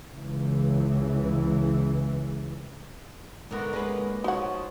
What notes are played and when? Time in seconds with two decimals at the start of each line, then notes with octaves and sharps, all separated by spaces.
0.12 C#2 E3
3.51 G#2 D3 B3 D4 F#4 A#4
3.73 G#3 A#3 C#4 B4
4.24 F3 D#4 F#4 C#5 F#5